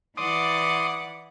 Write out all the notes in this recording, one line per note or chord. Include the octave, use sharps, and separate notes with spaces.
E3 D5 F#5 C6 D6 D#6